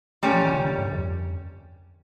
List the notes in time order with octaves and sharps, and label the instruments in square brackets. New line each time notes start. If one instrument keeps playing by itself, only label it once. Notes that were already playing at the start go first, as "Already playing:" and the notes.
[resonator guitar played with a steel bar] A#2 G3 C#4 [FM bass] A3
[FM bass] F3
E3
C#3
D3
D3
G2
F2